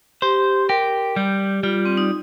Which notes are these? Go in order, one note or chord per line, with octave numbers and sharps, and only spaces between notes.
G4 C5
G4 A#4
G3 G4
G3 F4
C4
D#4